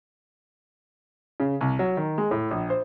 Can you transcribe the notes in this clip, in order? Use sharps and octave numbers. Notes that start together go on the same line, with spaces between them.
C#3
C2
F#3
D#3
G#3
A2
A#1
C5